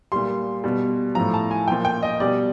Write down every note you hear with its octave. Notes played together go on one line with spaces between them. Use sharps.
A#2 G3 C6
B2 G3
A2 F3 A#5
A5
G#5
A#2 F3 G5
G5
D#5
B2 G3 D5